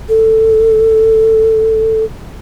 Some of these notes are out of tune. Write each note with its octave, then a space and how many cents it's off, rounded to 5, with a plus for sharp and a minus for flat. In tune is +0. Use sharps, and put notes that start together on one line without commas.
A4 +10